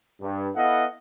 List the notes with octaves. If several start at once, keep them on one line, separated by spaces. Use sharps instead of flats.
G2
B3 E4 A4 D#5 F5 F#5